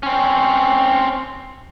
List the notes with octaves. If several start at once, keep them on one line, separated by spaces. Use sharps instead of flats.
C4 C#4